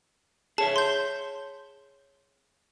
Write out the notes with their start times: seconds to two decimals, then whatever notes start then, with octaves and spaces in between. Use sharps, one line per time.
0.58 G#4 C#5 E5 A5
0.76 C6 G6